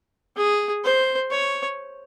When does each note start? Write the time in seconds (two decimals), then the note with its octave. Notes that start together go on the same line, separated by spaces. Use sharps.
0.36 G#4
0.84 C5
1.31 C#5